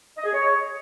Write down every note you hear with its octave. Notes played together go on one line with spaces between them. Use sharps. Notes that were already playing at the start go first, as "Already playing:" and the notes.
D#5
G#4
C#5